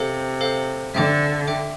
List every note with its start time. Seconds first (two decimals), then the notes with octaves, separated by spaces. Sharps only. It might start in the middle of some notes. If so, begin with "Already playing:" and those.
Already playing: C3 A4 C5 F5
0.41 A4 C5 F5
0.94 D3 E5 G5 D6
1.47 E5 G5 D6